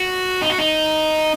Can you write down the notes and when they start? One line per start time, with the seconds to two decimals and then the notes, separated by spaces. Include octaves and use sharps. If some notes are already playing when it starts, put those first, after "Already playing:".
Already playing: F#4
0.42 D#4
0.50 F#4
0.58 D#4